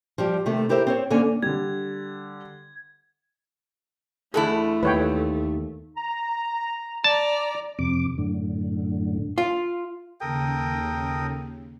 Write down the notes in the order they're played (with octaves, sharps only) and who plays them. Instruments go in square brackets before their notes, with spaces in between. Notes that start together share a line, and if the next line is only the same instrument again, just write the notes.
[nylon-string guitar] F3 G3 G4
C3 D#3 A3
E4 G4 A#4 C5 E5
C4 C5 C#5
D3 A#3 C#4 A4 G#5
[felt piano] D3 G3 [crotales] G#6
[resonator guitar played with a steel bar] E2 D3 E4 [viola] A3 [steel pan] G#4 A4
[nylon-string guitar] D#2 [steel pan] B4 C#5 G5
[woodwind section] A#5
[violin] D5 A#5 [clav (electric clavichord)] A5
[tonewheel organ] F2 C3 D6
F#2 A2 D3
[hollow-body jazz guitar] F4
[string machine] D#2 C#3 [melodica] A4 A#4 D#6 [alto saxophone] G5